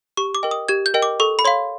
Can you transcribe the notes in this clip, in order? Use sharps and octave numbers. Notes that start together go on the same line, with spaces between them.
G4 C#6
D6
A#4 D#5 G5
D#6
G4 G#6
G6
A#4 D#5 G5
D6
A4 C#6
B5
C#5 F5 C6